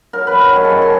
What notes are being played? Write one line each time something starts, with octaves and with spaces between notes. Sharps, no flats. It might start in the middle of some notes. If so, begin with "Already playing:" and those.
F#3 A#4
B4
F#2
A#4
D#3 G#4
A4
F#2
G#4